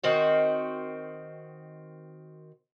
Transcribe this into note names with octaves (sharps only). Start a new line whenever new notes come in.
D#3 C4 F#4